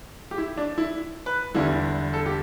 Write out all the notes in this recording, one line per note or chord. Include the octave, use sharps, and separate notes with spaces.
G4
E4
D4
E4
B4
E2 D3 G3 E4
A4
G4